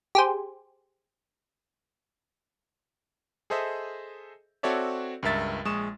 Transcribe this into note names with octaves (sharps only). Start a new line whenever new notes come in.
G4 G#4 C5
G#4 A4 C5 D#5 E5
C4 F#4 A4 C#5 D5 E5
C#2 G2 A#4 E5 A6
A#1 G#3 C#6 D#6 E7